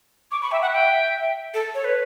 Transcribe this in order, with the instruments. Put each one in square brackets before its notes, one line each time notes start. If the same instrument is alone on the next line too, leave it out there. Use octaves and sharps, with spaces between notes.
[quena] C#6 [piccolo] D6
[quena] B5 [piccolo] C#6
[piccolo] E5 [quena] G5
[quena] E5 [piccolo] F#5
[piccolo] G5
[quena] A4
C#5
B4